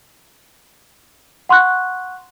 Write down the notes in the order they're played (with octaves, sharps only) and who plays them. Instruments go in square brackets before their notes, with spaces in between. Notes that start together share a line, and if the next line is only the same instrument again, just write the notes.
[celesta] F#5 C6 C#6 F#6